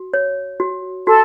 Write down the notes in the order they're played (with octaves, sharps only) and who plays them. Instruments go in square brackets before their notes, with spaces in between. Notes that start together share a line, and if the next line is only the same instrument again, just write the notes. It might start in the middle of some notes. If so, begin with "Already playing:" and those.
Already playing: [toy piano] F#4
C#5
F#4
[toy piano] F#4 [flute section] A4